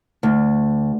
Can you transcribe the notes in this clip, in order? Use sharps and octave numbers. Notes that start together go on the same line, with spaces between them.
D2